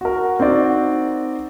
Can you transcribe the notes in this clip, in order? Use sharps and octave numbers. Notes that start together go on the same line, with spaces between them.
F#4 A#4
C4 D#4 F#4 D5